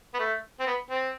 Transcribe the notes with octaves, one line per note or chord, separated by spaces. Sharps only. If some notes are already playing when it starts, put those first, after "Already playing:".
B3
A3
C4
B3
C4